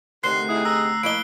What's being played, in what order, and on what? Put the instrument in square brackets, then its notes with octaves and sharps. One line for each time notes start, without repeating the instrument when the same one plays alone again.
[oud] D2 [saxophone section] C3 D#3 [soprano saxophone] C6 [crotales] F#6 C7
[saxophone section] C3 D#4 G#4 [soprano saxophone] E4
[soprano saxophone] A#5 [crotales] E6
[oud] F3 E4 D#5 [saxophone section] A#3 [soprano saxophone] B5 [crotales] D7 G7